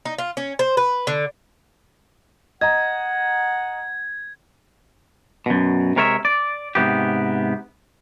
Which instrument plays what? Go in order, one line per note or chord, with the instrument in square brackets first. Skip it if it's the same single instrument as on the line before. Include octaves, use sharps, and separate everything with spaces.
[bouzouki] D#4
F4
C#4
C5
B4
D3
[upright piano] D#5 A#5 [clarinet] F#5 [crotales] G#6
[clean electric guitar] F#2 B2
C3 G#3 A#4 C#5 D5 E5
D5
G#2 C3 B3 G4